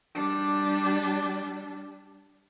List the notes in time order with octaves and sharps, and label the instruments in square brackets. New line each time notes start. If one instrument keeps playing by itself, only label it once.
[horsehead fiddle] G3 D4